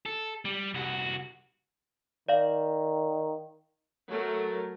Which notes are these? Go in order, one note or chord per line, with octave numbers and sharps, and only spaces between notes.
A4
G3
C2 F#4
D#3 D5 F5
F#3 A3 A#4